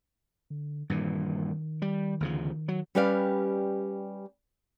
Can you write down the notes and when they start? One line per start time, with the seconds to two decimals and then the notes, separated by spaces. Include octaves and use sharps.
0.50 D3
0.90 G2 A#2 D#3 E3
1.82 G3
2.20 D2 C#3 F3
2.68 F#3
2.95 G3 C#4 G4 B4 D5 F5